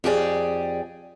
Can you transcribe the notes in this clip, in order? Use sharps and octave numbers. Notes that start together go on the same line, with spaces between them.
F2 G4 G#4 D5